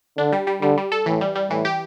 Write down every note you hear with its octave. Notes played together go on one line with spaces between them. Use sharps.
D3 D4
G3
G3
D3 G3
G3
A4
A2 E3
G3
G3
A2 E3
G4